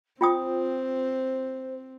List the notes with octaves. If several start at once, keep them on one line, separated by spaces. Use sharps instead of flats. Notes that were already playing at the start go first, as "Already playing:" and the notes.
C4 F4 C5 G5 D#6